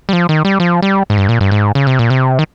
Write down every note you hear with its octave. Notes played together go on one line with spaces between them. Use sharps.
G3
F3
D#3
G3
F3
G3
G#2
G2
A#2
G2
G#2
C#3
C3
A#2
C3
D#3